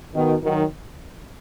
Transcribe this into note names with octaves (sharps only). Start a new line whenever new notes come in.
B2 D#3
D#3 F#3